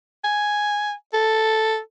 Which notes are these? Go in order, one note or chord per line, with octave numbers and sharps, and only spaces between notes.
G#5
A4